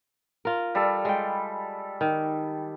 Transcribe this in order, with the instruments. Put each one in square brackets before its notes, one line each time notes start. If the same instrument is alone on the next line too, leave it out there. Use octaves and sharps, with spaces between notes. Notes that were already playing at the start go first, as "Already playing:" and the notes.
[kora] F4 A#4
[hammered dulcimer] G3 A4
[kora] G#3 G5
D#3